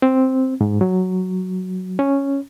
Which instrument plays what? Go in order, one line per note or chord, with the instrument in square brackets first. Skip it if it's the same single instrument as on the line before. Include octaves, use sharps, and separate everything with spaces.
[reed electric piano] C4
G#2
F#3
C#4